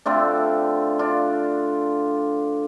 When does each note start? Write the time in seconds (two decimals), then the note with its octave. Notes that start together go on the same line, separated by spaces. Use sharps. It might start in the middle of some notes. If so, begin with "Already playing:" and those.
0.06 D3 A3 C4 D4 F4
0.99 D4 F4